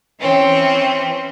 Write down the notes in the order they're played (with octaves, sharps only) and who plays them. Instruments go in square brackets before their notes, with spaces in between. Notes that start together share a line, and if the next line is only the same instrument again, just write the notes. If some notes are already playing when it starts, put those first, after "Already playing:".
[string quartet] E3 C4 C#4